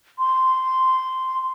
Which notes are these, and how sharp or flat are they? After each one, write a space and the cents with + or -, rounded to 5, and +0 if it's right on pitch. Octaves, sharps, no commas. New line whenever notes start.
C6 -10